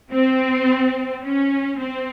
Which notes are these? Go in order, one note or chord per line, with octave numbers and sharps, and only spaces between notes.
C4
C#4
C4